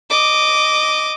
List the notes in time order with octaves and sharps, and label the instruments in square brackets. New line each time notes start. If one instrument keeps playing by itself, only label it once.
[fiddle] D#5 D6